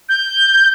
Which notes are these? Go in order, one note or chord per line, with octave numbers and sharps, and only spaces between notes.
G6